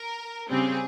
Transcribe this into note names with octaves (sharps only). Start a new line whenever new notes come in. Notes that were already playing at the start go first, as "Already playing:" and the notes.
Already playing: A#4
C#3 G3 C4 G#4